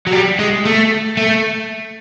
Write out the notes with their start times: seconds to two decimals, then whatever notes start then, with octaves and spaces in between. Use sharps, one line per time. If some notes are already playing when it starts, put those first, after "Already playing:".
0.07 F#3
0.12 G3
0.39 G#3
0.65 A3
1.17 A3